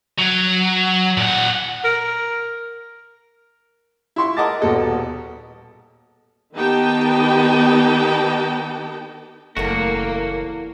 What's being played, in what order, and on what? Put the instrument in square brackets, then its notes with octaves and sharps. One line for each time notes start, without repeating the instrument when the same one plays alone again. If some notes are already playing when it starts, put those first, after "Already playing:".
[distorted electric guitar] F#3
A#2 F#5
[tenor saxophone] A#4
[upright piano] E4 F4 C6 C#6
A#4 D#5 F#5 A5 D6 A6
D#1 B2 A4 D#5
[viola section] D#3 B3 D#4 G4 G5 A5
[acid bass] F#1 [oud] E2 A3 [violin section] A#3 [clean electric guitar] F#4